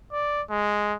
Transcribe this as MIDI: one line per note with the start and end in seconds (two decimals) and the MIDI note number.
0.12 0.42 74
0.50 0.95 56